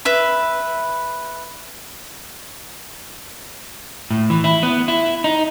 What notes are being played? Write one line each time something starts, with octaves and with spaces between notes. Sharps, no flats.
B4 E5 B5
A2
E3
E4
B3
E4
D#4